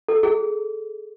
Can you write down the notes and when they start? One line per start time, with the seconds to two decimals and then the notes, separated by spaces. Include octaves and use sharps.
0.08 A4
0.23 G#4